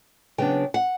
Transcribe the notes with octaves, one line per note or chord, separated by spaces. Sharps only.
C#3 F#3 B3 D4 G5
F#5